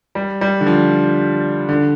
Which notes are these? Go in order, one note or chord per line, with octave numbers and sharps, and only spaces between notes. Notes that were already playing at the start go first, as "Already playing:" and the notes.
G3
G3
D3
F3
D3